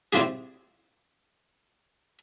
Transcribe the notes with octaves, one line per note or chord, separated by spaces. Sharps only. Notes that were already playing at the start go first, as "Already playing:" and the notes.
C4 E4 F4 G4 G#4